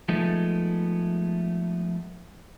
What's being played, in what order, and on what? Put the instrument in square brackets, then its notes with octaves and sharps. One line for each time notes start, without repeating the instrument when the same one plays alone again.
[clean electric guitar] F3 G#3 A3 B3 D#4